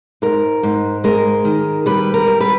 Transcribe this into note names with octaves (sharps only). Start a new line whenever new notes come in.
G#2 A#4
G#2
G#3 A#4
D#3
G3 B4
A#4
G3
B4